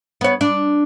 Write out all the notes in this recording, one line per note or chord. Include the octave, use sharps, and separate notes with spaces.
B3 C#5
D4